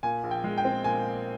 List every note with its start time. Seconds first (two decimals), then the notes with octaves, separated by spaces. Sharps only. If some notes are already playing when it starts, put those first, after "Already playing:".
0.03 A#2 G#5
0.23 A#1
0.31 G5
0.44 G#3
0.58 G5
0.65 C4
0.84 A#2 G#5